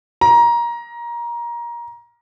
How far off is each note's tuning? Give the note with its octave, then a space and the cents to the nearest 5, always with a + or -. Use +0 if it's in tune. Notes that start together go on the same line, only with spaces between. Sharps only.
A#5 +20